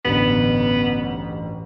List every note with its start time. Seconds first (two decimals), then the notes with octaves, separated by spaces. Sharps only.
0.05 A1 D2 G2 B3